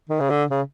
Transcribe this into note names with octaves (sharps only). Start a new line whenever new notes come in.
D#3
C#3
D3
C#3